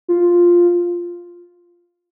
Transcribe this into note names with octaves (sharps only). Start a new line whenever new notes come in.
F4